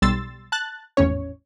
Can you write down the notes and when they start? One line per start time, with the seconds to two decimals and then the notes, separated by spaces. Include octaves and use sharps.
0.02 B1 G3 C6 E6 A6
0.52 A5 F#6 A6
0.97 G#1 E2 A2 C#4 C#5